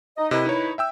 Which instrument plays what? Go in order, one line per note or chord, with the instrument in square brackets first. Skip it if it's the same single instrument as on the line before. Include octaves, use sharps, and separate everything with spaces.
[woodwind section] D#4 D#5
[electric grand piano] C3 D#5 [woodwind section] D#3 E4 B4
[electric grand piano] D#4 C#5
E5 G5 E6